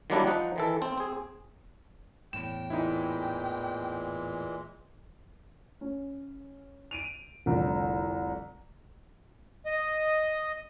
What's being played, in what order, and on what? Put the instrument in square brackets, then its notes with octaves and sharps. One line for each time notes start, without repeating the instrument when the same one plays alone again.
[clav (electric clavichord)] D#3 F#3 G3 A#3 D4 E4
F3 D#4 F#5
D#3 E3 A4
C4
C4 G#4
[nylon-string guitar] E2 A2 [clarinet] G5 [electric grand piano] E7
[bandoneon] A#2 E3 G#3 [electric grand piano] D#4 E4
[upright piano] C#4
D7 D#7 F7
F1 C2 D3
[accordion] D#5